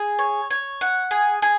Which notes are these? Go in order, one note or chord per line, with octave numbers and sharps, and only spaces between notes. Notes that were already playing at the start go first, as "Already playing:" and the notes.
Already playing: G#4
C#5
C#5
F#5
G#4
G#4